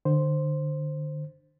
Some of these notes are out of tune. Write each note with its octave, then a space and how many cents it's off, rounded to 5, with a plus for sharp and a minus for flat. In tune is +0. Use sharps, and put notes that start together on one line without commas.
D3 +35 C5 +0